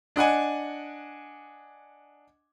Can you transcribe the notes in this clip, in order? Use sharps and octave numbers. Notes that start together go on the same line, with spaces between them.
D4 D#5 F#5 G#5